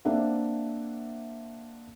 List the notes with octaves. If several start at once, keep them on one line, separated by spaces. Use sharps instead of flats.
A#3 C4 D4 E5 F#5